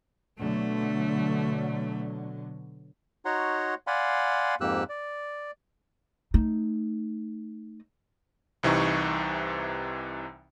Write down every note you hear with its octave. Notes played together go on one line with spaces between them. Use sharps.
B2 D3 F#3 A3
D#4 F#4 C#5 F#5 A#5 C6
D5 F5 F#5 G#5 B5 C6
F2 G#2 A#3 G4 E6 F#6
D5
A3 D#4
C2 C3 E3 D#4 C#6